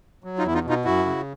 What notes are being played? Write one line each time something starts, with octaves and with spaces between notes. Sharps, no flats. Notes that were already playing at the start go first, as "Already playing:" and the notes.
F#3
D#4 F4
E2 E4
D#4 F4
B2
D#4 F4
F#2 E4 F#4
C#3